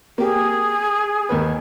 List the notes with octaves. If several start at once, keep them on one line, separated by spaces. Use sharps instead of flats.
A#3 G4 G#4
D#2 D#3 B4